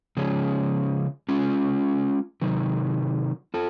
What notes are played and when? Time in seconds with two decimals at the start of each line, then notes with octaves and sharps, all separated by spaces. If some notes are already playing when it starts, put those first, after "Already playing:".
0.17 C#3 F3 G#3 C#4
1.29 G#3 C#4 F4
2.42 C3 D#3 F#3
3.54 F4 A4